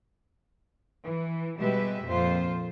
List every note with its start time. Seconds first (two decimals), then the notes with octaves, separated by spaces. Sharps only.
1.04 E3
1.58 B2 G3 G#3 G4 B4 E5
2.05 F2 A#2 F4 C5